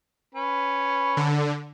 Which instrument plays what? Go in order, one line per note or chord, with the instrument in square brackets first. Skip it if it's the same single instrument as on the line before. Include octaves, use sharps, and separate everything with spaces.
[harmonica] C#4 B4
[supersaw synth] D3